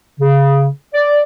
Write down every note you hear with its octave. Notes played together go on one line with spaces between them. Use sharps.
C#3
D5